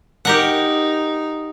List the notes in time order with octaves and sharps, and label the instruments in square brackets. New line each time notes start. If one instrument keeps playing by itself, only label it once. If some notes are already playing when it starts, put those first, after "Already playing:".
[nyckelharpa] D#4 [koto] G4 A#4 F#5